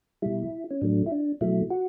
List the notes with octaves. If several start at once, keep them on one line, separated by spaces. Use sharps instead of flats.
B2 G3 E4
C#4
A2 F#3 A3 D4
E4
D4
B2 F#3 A3 E4
F#4